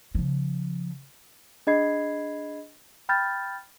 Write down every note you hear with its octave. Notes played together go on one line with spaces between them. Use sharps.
C#3 F3
D4 G#4 D#5 B5 G#6 C7
G5 B5 F6 G6 A6